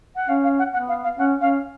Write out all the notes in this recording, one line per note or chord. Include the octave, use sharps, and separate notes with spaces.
F#5
C#4 F5
F5
F#5
B3 F#5
F5
F5
C#4 F#5
C#4 F5